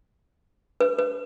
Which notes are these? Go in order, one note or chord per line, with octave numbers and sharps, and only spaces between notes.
B4
B4